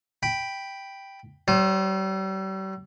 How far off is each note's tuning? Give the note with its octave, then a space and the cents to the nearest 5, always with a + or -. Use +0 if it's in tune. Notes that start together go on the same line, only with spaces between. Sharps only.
G5 +0 B5 +0
G3 -40 C5 +30